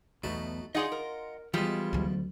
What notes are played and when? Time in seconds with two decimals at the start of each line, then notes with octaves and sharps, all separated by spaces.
0.24 B1 E2 B2 A3 D#4 F#4
0.75 D#4 F4 G#4 D5 D#5 F#5 C6
0.92 A#4
1.54 B2 E3 F3 G3 G#3 F4
1.93 D2 F#3